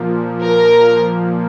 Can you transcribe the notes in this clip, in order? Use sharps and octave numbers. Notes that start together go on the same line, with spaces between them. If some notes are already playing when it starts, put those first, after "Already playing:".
Already playing: A#2 F3 A#3
A#4